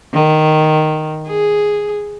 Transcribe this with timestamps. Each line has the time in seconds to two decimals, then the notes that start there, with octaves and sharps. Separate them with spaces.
0.13 D#3
1.27 G#4